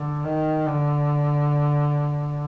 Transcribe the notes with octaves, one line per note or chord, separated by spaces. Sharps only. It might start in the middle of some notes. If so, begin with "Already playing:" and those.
Already playing: D3
D#3
D3